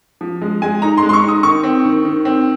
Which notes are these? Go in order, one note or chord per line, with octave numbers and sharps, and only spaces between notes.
F3
G#3
G#3 G#5
D#4 A#5
C6
G#3
C6
C#6
D#4 D#6
D#3 C#6
C4
D#3
D#3
C4